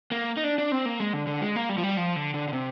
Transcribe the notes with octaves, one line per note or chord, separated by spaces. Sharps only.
A#3
D#4
D4
D4
C4
A#3
G#3
D3
D3
G#3
A#3
G3
F3
G3
F3
D3
D3
D3
C3